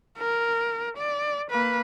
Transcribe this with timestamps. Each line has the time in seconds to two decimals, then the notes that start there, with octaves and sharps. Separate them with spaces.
0.18 A#4
0.97 D5
1.51 A#3 B4